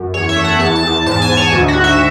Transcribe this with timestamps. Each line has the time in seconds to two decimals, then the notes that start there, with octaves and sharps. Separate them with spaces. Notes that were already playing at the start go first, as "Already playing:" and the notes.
Already playing: F#2
0.14 E2 C#5
0.29 E5
0.36 A3
0.44 F#5
0.59 E2 A5
0.76 A5
0.83 E2
1.06 G#2 A5
1.22 G#5
1.29 G#2
1.37 C#5
1.52 D2
1.68 F#4
1.76 D2
1.84 E5